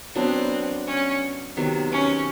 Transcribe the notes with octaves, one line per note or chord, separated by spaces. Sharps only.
F#3 B3 C4 D4
C#4
C3 D#3 F#3 B3
C#4